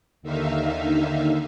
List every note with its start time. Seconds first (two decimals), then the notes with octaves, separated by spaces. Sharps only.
0.22 D#2 D3 D#3 D#4 E5 F5